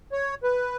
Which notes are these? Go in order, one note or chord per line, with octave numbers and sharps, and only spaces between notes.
C#5
B4